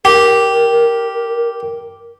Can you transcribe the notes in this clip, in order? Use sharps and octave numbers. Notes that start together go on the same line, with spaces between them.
G4 A#4